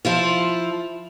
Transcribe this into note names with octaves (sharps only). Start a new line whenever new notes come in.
F3 E4 F4